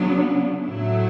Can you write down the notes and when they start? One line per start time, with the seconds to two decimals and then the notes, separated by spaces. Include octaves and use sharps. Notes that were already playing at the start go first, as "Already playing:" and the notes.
Already playing: C#3 F#3 B3 D4
0.64 A2 F#3 A3 E4